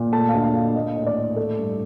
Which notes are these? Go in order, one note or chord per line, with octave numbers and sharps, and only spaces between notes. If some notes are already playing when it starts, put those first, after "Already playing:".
Already playing: A#2
A3 A5
F5
D2
F5
D2
A#3 D#5
A2
D5
A2
A3
G2